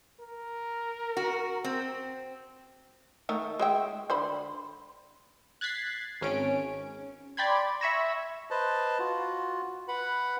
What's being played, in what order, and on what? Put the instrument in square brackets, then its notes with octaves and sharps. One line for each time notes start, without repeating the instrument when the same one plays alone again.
[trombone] A#4
[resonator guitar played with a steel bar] F#4
C4
[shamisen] D#3 A3 A#4
G#3 E5 G5
D3 C5 B5
[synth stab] F#6 G#6 A6 B6 C7
G#1 C#4 D7
D5 G5 B5 C6 G#6
E5 B5 C#6 E6 G#6 A#6
[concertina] B4 C5 D#5 A5
F4 F#4
B4 F#5 B5